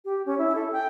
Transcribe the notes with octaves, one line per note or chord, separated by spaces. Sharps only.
G4
C#4
E4
A4
G5